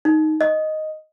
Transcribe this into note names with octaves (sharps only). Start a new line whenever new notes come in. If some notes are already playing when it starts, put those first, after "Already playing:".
D#4
D#5